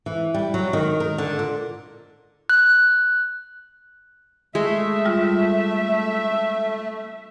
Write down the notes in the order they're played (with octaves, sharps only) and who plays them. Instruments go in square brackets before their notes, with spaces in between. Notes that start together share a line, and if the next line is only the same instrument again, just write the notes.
[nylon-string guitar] E3
G3
F#3
D#3
A#4
D3
A#2
[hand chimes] F#6
[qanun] G#3 [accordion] A3 [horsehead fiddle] E5
[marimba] G3 F4